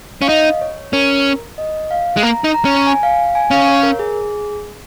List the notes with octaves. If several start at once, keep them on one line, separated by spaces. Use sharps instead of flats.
C#4 F5
D#4 D#5
C#5
C#4 A#4
D#5
F5
G#3
A#3 A#5
D#4
A#5
C#4
G#5
F5
G#5
C#4 F5
C#5
A#4
G#4